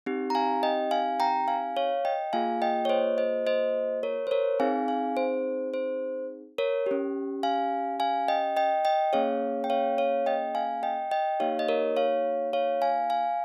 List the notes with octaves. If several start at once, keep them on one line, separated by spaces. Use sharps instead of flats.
C4 D#4 G4
A#5
F5 G#5
D#5 G5
F5 G#5
G5 A#5
F5 G#5
C#5 F5
D#5 G5
A#3 F4 G#4 F5 G#5
D#5 G5
C#5
C5 D#5
C5 D#5
C5 D#5
A#4 C#5
C5
A#4 C#5
C4 D#4 G#4 F5 G#5
F5 G#5
C5
C5
A#4 C#5
C#4 G4
F5 G#5
F5 G#5
D#5 G5
D#5 G5
D#5 G5
A#3 C#4 G#4 C#5 F5
G5
C#5 F5
C#5 F5
D#5 G5
F5 G#5
D#5 G5
D#5 G5
A#3 D#4 G4 C#5 F5
D#5
A#4 C#5
C#5 F5
C#5 F5
F5 G#5
F5 G#5